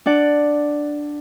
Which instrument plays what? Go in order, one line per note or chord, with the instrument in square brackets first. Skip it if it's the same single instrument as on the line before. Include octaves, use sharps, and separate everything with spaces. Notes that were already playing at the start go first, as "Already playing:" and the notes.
[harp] D4 D5 F#5